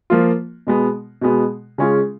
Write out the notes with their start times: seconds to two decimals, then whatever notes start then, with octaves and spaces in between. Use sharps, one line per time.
0.10 F3 A#3 F4
0.67 B2 G#3 B3
1.21 B2 G#3 B3
1.78 C#3 G#3 C#4 F4